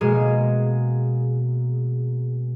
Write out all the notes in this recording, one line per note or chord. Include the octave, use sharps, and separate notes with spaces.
B2 G#3 A#3 G#4